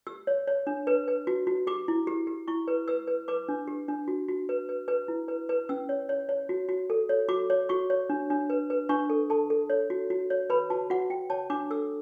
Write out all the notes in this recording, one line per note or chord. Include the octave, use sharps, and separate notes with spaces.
G4 E6
C#5
C#5
D4
B4
B4
F#4
F#4
G4 D6
E4
G4
G4
E4 C#6
B4
B4 E6
B4
B4 D6
D4
G4
D4
F#4
F#4
B4
B4
B4
E4
B4
B4
C#4 E6
C#5
C#5
C#5
F#4
F#4
A4
C#5
F#4 D6
C#5
F#4 C#6
C#5
D4
D4
B4
B4
D4 C#6
A4
A4 A5
A4
C#5
F#4
F#4
C#5
B4 B5
F#4 A5
F#4 F#5
F#4 G5
C#5 A5
D4 D6
A4 E6